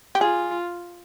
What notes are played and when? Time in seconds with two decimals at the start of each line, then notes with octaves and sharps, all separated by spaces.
0.15 G4
0.20 F4 G#4